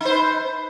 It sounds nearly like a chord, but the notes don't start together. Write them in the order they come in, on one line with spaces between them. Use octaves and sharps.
D#4 C5 B4